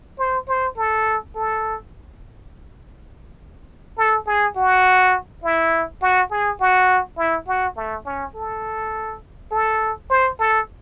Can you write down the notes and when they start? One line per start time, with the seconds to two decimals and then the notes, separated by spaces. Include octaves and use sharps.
0.18 C5
0.48 C5
0.77 A4
1.36 A4
3.98 A4
4.27 G#4
4.56 F#4
5.44 E4
6.02 F#4
6.31 G#4
6.60 F#4
7.18 E4
7.47 F#4
7.77 A3
8.05 C#4
8.35 A4
9.52 A4
10.10 C5
10.39 A4